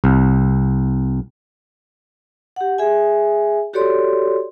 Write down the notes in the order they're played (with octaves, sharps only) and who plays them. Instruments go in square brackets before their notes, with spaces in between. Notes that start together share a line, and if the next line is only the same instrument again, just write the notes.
[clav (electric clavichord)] C2
[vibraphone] G4 F#5
G#4 E5 G#5
F#4 G4 A4 C#5 D5 C6